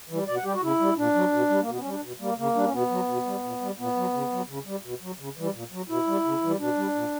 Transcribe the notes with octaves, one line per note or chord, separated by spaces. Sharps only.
E3 G3
B2 D5
F#5
G3 G4
F#4
C#3 E4
G3
A#2 D4
F#3
B2
G3
A#3
B2 B3
C#4
G3
D4
B2
G3 A#3
C#3 A#3
G3 D4
C#4
B2 B3
F#3
B2
G3
A#2
G3
A#2 B3
F#3
C#3
F#3
C#3
G3
B2
F#3
C#3
E3 G3
A#2
F#3
B2 E4
G3
C#3
E3 G3
B2 D4
G3
A#2